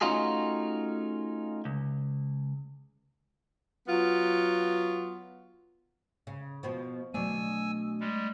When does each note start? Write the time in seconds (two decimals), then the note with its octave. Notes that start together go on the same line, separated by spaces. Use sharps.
0.01 A3 C#4 D#4 F4 F#4 G#4
1.65 C#2
3.87 F#3 B3 F4
6.27 C#3
6.63 B2 F3 B3
7.14 B2 F#3 A3 D4 G#5 E6
8.00 G3 G#3